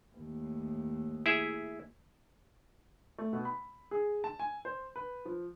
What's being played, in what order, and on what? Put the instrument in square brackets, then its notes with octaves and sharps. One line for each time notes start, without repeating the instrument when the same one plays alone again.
[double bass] D#2 A2
[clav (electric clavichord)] E4 G#4 E5
[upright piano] A3
B2
B5
G#4
A5
G#5
C5
B4
F3